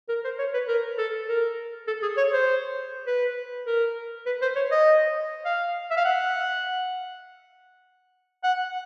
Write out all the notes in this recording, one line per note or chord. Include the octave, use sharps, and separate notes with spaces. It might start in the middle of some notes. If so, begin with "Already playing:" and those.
A#4
C5
C#5
B4
A#4
A4
A#4
A4
G#4
C#5
C5
B4
A#4
B4
C5
C#5
D#5
F5
E5
F5
F#5
F#5